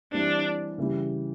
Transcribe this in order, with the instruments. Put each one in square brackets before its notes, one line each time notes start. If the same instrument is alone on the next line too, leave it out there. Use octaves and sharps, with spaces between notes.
[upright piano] E3 G3 C4 [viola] D4
[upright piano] C#3 E3 G3